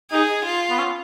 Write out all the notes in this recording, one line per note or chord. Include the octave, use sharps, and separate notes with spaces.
D#4 G#4
F4
B3
C#4